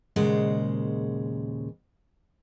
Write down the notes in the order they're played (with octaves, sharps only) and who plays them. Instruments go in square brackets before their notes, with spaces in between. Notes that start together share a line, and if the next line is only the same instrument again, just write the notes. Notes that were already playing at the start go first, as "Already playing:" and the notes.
[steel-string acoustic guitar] D#2 A#2 C#3 G#3 C5 F#5